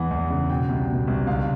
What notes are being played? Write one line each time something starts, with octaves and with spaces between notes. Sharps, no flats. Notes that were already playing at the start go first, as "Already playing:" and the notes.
Already playing: E2 E3 F#5
E2
C#3
B2 G5
C2
B2
C2
C#2 F5